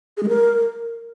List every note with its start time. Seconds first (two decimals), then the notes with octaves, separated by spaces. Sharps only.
0.17 G#4
0.23 G#3
0.29 A#4